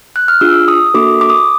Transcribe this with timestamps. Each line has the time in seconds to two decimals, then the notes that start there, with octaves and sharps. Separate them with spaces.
0.16 F#6
0.28 F6
0.41 D4 F4 G#4 E6
0.68 D#6
0.86 D#6
0.94 A#3 D4 F#4 A4 D6
1.21 D6
1.30 D#6
1.37 D6